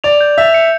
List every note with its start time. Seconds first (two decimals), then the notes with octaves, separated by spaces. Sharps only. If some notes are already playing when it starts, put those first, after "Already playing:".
0.04 D5 F7
0.21 G6
0.37 E5 G6
0.54 C#7